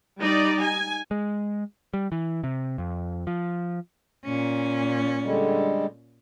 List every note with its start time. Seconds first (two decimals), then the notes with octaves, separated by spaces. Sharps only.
0.20 G3 D#4 D5
0.62 G#5
1.11 G#3
1.94 G3
2.12 E3
2.44 C3
2.78 F2
3.27 F3
4.25 A#2 C#4
5.25 D3 G3 G#3